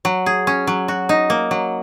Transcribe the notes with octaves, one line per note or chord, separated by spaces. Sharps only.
F#3
G#4
C#4
F#3
F#4
D#4
A#3
F#3